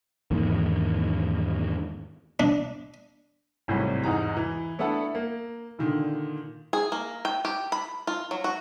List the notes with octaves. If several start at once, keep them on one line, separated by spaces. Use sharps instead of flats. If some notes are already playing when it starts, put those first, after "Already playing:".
E2 G#2 D#3 A#3
D4
G#1 A2 C3 F#3 G3
E2 G#2 D#4 A#5
E3
A3 B3 D4 E4 A4 F#5
A#3
A#2 D3 D#3
G#4
A#3
G5
G4
B5
F4
F#3
F#4